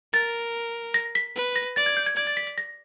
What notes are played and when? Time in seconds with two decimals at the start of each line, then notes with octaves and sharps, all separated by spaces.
0.13 A#4 A6
0.94 A#6
1.15 B6
1.35 B4
1.56 A#6
1.76 D5 A6
1.86 G#6
1.97 G6
2.06 G#6
2.17 D5 G#6
2.27 A6
2.37 B6
2.47 B6
2.58 A#6